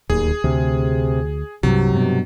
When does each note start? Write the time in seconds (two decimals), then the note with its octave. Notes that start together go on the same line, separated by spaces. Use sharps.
0.10 D1 D#2 G#4
0.44 D2 C3
1.63 C2 G2 C3 F#3
1.93 G2 B2